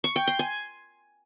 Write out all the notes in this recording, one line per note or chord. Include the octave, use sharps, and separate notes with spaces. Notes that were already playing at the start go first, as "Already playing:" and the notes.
C#6
G5
C6
G#5